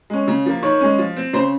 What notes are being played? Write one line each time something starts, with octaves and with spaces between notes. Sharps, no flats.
G#3 C#4
C#3
F3 A#3
D#3 C#5
G#3 C#4
F3
C4
C#3 C5